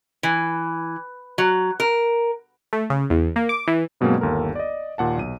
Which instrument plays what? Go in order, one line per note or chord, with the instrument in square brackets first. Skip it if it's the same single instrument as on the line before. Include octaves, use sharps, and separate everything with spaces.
[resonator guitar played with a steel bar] E3
F#3
A#4
[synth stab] A3
C#3
E2
A#3
D6
E3
[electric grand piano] G2 B2 F#3 G#3 A#3 C4
G1 D#2 A4 A#4
D5 D#5
D#2 A#2 F#5 A5
B1 D#7